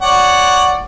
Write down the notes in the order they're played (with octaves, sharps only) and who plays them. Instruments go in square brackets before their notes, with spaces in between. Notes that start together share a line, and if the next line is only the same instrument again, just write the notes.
[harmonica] C#5 D5 F#5